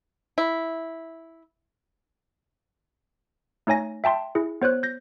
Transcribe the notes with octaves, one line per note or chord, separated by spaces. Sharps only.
E4
A3 D#4 C#5 G#5 A#6
E5 G5 A5 C6
E4 G#4
B3 C5 C#5 F#6
G6 A#6